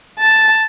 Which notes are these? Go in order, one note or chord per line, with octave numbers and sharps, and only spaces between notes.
A5